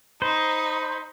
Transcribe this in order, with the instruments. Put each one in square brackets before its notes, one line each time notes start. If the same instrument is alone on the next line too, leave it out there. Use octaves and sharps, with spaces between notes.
[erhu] D#4 [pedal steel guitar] C5 [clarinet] B5